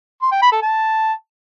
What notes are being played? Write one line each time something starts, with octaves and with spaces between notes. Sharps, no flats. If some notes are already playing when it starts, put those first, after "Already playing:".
C6
G5
B5
A4
A5